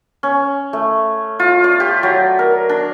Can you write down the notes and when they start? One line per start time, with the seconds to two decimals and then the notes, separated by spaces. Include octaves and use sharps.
0.23 C#4
0.73 A3
1.39 F4
1.64 D5
1.80 G4
2.03 F#3
2.39 A#4
2.69 D4